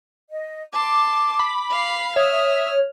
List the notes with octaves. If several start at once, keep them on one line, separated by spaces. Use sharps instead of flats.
D#5
A5 C6 D6
B5
F5 C7
C#5 E5 D#6 F6